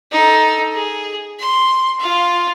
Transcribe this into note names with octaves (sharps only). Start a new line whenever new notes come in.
D#4 A4
G#4
C6
F4 F5